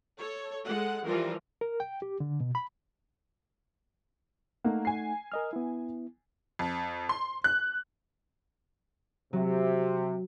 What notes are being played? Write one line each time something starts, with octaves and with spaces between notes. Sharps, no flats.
A4 C#5
G#3 A4 F#5
E3 F3 G3 F4 A#4
A#4
G5
G4
D3
B2
B5
A3 A#3 D#4 F#5
G#5 C7
A#4 D#5 F6
B3 E4
F2
C6
F#6
C3 F#3